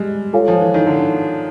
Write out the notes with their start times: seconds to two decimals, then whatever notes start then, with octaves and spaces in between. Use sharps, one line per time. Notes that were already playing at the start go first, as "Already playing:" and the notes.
Already playing: G3 G#3
0.33 F4 A4 C#5 F5 G#5
0.48 F3
0.61 E3
0.74 D#3
0.87 D3